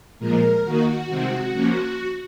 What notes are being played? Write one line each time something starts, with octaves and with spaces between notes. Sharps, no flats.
A#2 F3 G#3 A#4
D#3 A#3 D#4 F#4
C3 D#3 G#3 C4
F3 A#3 C#4